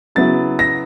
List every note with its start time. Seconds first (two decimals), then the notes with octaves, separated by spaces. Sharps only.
0.15 C#3 F#3 B3 E4 A6
0.59 A#6